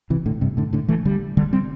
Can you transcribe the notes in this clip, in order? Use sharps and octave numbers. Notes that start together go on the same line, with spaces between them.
C3 E3
A2 D3
G2 C3
A2 D3
A2 D3
E3 A3
D3 G3
D3 G3
G3 C4